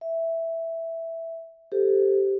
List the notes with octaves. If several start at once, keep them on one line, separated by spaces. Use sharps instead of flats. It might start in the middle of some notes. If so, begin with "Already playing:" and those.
E5
G4 A4 C5